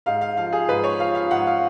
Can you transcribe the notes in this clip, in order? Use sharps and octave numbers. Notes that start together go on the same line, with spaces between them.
G#2 F5
F5
F3 F5
G#4
G#2 B4
C#5
F3 F5
F5
G#2 F#5
F5